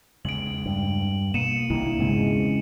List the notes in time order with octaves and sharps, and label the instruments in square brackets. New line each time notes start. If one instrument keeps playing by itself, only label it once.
[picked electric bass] E2 C#3 G#3 [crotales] D7 F#7
[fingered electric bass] G2
[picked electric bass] B2 [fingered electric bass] A#3 [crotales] C#7 D#7 E7
[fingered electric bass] C2 C3 D#3 [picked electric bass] G#3 A#3 [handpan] D4 E4
[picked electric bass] E1 E2 [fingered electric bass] G#2 [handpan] C#3 G#3 C4